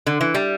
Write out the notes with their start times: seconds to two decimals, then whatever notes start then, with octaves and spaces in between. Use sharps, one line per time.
0.07 D3
0.21 E3
0.34 G3